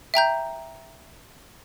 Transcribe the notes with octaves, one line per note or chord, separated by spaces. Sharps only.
E5 G5 A#5 G6